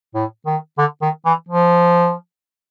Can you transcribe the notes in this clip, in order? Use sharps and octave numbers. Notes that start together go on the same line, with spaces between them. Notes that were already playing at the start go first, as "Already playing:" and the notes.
A2
D#3
D3
D#3
E3
F3